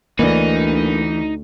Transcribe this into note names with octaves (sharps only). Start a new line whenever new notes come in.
D2 E3 A#3 D4 D#4